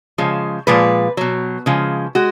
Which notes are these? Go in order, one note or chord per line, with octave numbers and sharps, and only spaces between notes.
C#3 F3 G#3
A#2 F3 G#3 B4
B2 F#3
C#3 F3 G#3
G#3 F#4